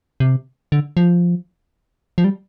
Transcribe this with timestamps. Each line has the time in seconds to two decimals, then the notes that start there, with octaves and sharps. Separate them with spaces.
0.20 C3
0.72 D3
0.97 F3
2.18 F3
2.24 G3